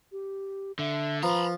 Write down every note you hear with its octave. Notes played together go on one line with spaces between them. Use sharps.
G4
D3 E5
F3 B4 A#5 B5